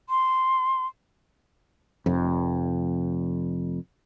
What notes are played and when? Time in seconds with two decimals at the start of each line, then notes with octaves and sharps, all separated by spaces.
0.09 C6
2.06 F1 F2